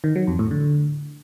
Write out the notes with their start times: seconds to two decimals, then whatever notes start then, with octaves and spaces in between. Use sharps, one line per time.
0.04 D#3
0.16 F#3
0.27 F2
0.39 A2
0.51 D3